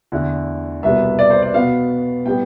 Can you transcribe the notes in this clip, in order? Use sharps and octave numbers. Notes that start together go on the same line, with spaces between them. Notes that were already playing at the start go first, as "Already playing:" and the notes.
E2 D3 A3
C2 B2 G3 B3 E5
D5
C5
D5
B2 B3 F5
A2 G3 B3 G5